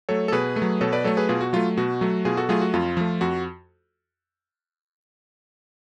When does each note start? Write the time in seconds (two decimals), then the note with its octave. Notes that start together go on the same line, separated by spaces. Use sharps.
0.09 F#3 A3 A4 C#5
0.28 A4
0.32 B2 G#4 B4
0.56 A3
0.62 F#3
0.81 B2 A4 C#5
0.92 B4 D5
1.04 F#3 A3 A4 C#5
1.17 G#4 B4
1.29 B2 F4 G#4
1.41 F#4
1.53 F#3 A3 F4
1.78 B2 F#4
2.01 F#3 A3
2.25 B2 F4 G#4
2.37 F#4 A4
2.49 F#3 A3 F4 G#4
2.61 F#4
2.74 F2 F4
2.97 F3 A3
3.21 F2 F#4